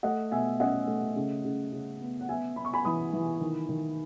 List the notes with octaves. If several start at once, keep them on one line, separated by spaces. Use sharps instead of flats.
A3 D#5 F#5
B2 E5 G#5
C#4 D#5 F#5
A3
C#3
C#3
C#3
B3
F#5
B3 E5 G#5
B3 B5
C#6
G#5 B5
E3 B5 D#6
E3
D#3
D#3